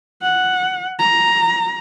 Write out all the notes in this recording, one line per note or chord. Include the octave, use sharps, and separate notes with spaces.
F#5
A#5